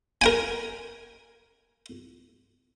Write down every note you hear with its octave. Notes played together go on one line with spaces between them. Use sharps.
A#4 G5 G#5